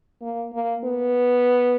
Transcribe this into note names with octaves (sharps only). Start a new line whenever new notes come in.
A#3
A#3
B3